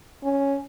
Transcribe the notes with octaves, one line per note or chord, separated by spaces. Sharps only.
C#4